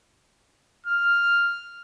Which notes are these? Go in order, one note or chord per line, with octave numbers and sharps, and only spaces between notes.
F6